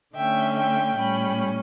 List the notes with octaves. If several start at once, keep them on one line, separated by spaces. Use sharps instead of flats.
D3 A3 C#4 E5 G5
E5 G5
A2 G3 C#4 G5 B5